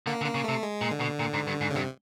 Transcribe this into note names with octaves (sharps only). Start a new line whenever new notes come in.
D3 A#3
D3
A#3
C#3
C3 A3
G#3
A#2
D3
B2
A#2
G#2
G2
G#2
C#3
G2 C3